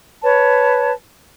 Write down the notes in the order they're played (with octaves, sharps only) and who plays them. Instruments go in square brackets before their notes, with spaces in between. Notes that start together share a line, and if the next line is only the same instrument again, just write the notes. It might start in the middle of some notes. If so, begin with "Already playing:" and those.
[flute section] B4 C#5 A5